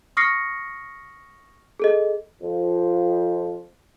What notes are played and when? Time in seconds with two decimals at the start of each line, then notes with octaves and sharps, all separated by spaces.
0.17 C#6 D#6 F6 A#6 C7 C#7
1.80 G#4 A4 D#5
2.42 F2 F3